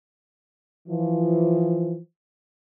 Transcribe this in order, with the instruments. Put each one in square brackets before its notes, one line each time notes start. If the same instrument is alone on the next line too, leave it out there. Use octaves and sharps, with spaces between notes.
[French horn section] E3 F3